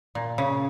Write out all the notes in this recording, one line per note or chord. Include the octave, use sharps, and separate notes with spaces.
A#2
C#3